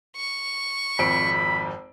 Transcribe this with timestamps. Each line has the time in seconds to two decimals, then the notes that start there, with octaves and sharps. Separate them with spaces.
0.16 C#6
0.99 G#1 F2 B5 D7